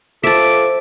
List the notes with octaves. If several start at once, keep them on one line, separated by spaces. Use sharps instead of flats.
F4 A4 C5 E5 A5 D6